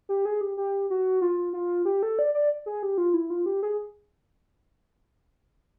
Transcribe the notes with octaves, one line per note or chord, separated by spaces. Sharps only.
G4
G#4
G4
G4
F#4
F4
F4
G4
A4
D5
D5
G#4
G4
F4
E4
F4
G4
G#4